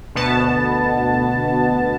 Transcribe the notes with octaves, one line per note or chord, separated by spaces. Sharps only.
D2 B2 B3 A5